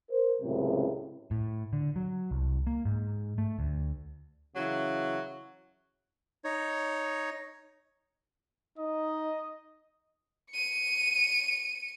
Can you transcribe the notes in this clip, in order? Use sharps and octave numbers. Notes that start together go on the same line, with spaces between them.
A#4 C5
C#2 F#2 A2 C3
A2
D3
F#3
C2
A#3
G#2
A3
D2
C#3 E3 F#3
D#4 C#5
D#4 D#5
C#7 D#7